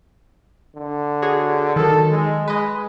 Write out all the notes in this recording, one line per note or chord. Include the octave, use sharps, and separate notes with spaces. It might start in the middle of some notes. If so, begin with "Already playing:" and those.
D3
F#4 G#4 C#5
D#3 F#3 A4
G#3
G#3 B4 D#5